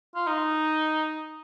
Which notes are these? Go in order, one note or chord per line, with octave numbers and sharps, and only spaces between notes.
F4
D#4